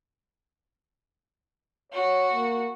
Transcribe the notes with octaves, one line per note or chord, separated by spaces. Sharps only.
F#4 C#5
A#3